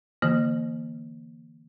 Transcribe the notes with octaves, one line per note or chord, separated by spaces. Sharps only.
D3 E3 A#3